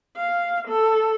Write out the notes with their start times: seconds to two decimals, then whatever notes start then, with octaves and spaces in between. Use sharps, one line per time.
0.17 F5
0.68 A4